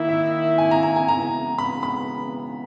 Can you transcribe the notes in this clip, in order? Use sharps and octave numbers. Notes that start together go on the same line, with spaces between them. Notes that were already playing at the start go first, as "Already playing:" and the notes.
Already playing: D#3 A#3 E4
E5
G#5
A#5
A#5
G#5
C#3 E3 G#3 B3 F#4 A#5
B5
B5